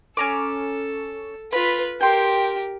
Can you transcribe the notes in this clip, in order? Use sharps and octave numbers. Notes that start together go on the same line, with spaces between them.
C#4 A4 A#5 D6
F4 B4 B5
G4 A#4 G5 C6